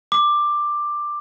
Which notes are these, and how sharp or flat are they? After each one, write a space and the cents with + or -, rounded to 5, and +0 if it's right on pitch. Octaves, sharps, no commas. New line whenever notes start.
D6 +10